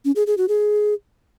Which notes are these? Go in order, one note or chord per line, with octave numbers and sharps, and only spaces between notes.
C#4
G#4
G#4
F#4
G#4